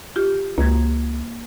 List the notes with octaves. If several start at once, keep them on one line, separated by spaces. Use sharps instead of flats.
F4 G4
C#2 A#3 G#6